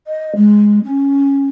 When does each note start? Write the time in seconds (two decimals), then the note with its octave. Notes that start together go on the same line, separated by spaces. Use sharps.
0.07 D#5
0.36 G#3
0.84 C#4